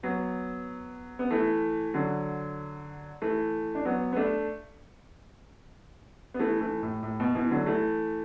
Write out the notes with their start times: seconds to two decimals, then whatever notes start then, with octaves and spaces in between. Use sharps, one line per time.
0.03 F#3 B3
1.19 B3
1.31 E3 A3
1.94 D3 F#3
3.22 E3 A3
3.75 D4
3.85 F#3 B3
4.13 B3
4.16 A3 D4
6.34 B3
6.39 E3 A3
6.60 E3 A3
6.83 A2
7.03 A2
7.20 B2
7.35 B2 E3
7.51 D3 F#3
7.66 E3 A3